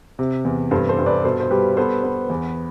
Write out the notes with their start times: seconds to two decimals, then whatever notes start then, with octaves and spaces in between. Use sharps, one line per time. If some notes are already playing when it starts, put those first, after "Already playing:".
0.19 C3
0.45 E2
0.71 G2 A4 C5
0.89 A4 C5
0.98 G2
1.06 B4 D5
1.24 B2 A4 C5
1.40 C5
1.50 G3 G4 B4
1.77 B3 A4 C5
2.04 B3
2.30 E2